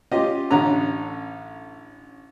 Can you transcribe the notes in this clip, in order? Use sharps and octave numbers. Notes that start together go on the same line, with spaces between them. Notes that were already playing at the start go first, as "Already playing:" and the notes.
C#4 F4 G4 D#5
A1 D3 C#4 A#5